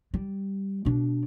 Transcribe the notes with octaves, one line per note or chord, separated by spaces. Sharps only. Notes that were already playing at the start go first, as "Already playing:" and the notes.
G3
B2 D4